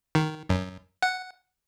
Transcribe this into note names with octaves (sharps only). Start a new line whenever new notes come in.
D#3
F#2
F#5